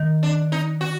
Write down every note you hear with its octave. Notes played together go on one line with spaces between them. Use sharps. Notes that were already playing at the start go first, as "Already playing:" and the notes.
Already playing: D#3
D4
D#4
F#4